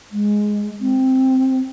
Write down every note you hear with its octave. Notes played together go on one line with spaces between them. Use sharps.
G#3
C4